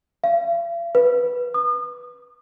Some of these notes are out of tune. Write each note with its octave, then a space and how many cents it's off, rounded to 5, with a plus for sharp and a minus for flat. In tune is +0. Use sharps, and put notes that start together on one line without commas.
F5 -45
B4 -10
D#6 -40